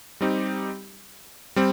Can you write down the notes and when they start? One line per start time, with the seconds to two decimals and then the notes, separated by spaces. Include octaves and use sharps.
0.21 G3 C4 D#4 G4
1.56 G3 C4